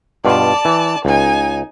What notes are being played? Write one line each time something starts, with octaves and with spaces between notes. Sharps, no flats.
G2 B2 F4 D5 A5
E3
C#2 D#4 G#5